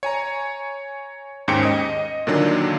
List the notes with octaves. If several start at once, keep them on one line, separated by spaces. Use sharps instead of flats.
C#5 G#5 A#5
D#2 G#2 C#4 C5 G5 C#7
D#5 D#6
A#2 D3 D#3 F#3 D4